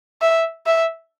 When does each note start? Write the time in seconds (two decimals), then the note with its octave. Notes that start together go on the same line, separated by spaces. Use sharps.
0.21 E5
0.66 E5